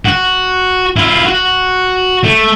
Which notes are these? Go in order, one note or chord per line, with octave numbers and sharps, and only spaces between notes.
F#4
E4 F4
F#4
A3